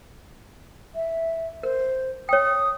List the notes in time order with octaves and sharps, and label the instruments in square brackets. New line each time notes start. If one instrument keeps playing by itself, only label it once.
[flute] E5
[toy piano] A#4 [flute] C5
[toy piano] C#5 G5 [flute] D#6